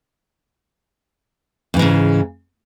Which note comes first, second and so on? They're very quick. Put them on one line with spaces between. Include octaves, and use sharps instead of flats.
F2 E3 G#2 C#3